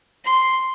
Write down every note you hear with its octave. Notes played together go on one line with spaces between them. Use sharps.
C6